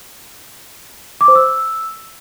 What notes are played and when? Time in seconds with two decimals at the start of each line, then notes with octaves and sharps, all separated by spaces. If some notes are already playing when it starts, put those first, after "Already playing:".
1.21 D6
1.28 C5
1.35 E6